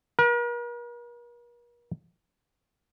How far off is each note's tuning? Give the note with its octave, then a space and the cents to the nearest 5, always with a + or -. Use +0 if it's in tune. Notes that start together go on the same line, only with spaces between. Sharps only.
A#4 +45